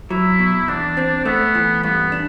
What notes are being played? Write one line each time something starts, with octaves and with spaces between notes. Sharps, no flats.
F#3 E4
B2
E2 D4
C4
A3 B3
E3
G2 B3
D4